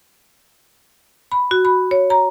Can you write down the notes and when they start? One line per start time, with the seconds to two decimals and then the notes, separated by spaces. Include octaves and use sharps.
1.32 B5
1.51 F#4
1.65 B5
1.91 C#5
2.10 A#5